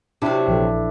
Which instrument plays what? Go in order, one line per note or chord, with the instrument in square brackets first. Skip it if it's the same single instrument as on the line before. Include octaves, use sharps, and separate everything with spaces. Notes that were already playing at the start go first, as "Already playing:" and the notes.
[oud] C3 F#3 [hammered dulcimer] D4 E4
[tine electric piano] A#1 E3 A4